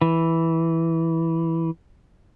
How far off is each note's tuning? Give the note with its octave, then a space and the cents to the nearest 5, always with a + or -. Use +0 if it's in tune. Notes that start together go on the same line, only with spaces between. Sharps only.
E3 -5